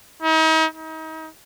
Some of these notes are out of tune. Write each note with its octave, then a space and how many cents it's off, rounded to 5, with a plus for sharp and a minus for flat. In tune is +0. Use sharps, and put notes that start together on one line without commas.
D#4 +40
D#4 +35